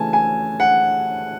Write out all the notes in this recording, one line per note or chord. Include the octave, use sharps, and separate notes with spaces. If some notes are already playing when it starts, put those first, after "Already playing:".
Already playing: C#3 E3 A3 C#4 G#5 A5
G#5
F#5